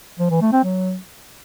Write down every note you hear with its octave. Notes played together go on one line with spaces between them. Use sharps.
F3
E3
A3
C4
F#3